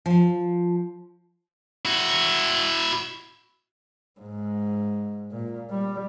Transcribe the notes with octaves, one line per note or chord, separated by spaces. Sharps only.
F3
E4 F#4
G#2
A#2
G3